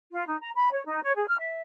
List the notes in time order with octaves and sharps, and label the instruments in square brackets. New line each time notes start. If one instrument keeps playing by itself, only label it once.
[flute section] F4
D#4
A#5
B5
C#5
D#4
C#5
G#4
F6
E5